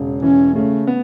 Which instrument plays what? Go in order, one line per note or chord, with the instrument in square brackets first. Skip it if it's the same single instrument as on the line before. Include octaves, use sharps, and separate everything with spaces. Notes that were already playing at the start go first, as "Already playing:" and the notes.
Already playing: [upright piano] E1 C#3
[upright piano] E3 [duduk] C#4
[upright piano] C#3 [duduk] A3
[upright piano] B3